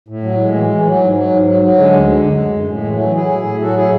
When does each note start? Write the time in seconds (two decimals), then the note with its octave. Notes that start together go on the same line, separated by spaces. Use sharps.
0.08 A2
0.23 F#3
0.39 A2 G#3
0.54 E3
0.69 E3
0.85 F#3
1.00 G#2
1.15 F#3
1.30 G#2
1.47 F#3
1.62 F#3
1.77 D3 G#3
1.92 D2
2.08 D3
2.23 F#2
2.38 F#2
2.53 F#2
2.68 A2 G#3
2.84 E3
2.91 F#3 A3
3.00 E3
3.15 F#3 E4 G#4
3.31 A2
3.46 A2
3.61 F#3 F#4 A4
3.76 A2 E4 G#4